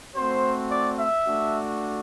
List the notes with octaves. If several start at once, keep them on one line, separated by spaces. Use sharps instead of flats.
A3 C4 F#4 C5
D5
E5
A3 D4 F#4